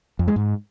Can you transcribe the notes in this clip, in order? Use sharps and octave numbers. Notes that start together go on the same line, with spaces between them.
F2
G#3
G#2